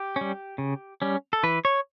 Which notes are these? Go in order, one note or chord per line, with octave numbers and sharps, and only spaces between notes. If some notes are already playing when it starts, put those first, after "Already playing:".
Already playing: G4
G3 C#4
C#3
G3 C#4
A4
E3 B4
C#5